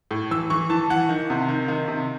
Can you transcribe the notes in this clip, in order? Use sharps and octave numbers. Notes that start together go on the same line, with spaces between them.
A2
E3 E6
E3 C#6
E3 A5
E3 F#5
D#3
C3
D#3
D#3
C3